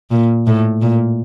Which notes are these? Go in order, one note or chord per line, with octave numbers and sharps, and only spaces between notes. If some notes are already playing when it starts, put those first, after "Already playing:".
A#2
A2
A#2